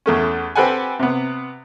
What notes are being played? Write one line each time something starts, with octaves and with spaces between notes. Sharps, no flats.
E2 A3 C#4
C4 G4 A4 B4 F#5 G#5
C3 B3